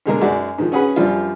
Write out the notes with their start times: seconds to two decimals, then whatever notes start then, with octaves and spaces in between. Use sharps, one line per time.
0.06 B2 D3 G#3 A#4
0.21 F#2 G#3 F#4 D5
0.58 G#2 D#3 F3
0.72 C#4 F#4 G#4 B4 F#5 B5
0.96 F#2 F3 G3 D4 F4